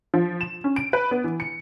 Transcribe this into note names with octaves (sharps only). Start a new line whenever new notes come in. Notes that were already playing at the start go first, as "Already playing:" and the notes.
F3
E7
C#4
D7
B4
B3
E3
C#7